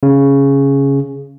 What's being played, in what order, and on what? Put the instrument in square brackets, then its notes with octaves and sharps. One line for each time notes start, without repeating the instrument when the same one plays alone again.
[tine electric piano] C#3